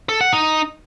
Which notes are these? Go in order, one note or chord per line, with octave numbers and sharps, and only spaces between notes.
A4
F#5
D#4